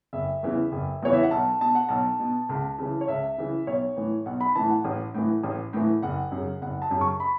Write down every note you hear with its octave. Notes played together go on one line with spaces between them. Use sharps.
F#1 E5
E2 C#3 E3
F#1
E2 C#3 E3 C#5
E5
F#5
B1 A5
B2 A5
F#5
B1 A5
B2
C#2
C#3 E3
C#5
C#2 E5
C#3 E3
B1 C#5
A2 E3
B1 F#5
B5
A2 E3 A5
F#5
A1
A2 E3
A1
A2 E3
F#1 F#5
F#2 C#3
F#1 F#5
A5
F#2
C#3
C#6
B5